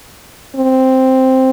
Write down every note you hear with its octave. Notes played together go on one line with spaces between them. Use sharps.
C4